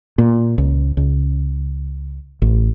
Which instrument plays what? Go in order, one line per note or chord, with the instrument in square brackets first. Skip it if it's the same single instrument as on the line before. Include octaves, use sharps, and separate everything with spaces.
[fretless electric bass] A#2
C#2
C#2
A1